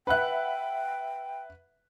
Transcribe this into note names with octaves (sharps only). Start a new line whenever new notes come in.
B4 E5 F#5 G5 B5 F#6